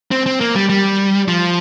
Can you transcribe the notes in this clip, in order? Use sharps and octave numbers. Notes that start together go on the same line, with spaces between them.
C4
C4
A#3
G3
G3
F3